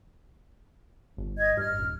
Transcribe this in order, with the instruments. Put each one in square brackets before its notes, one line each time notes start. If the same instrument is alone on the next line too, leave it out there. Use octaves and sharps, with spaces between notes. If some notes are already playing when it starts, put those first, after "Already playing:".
[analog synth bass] G1
[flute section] D#5 G#6
[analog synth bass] G2 [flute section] F6
[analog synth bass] D#1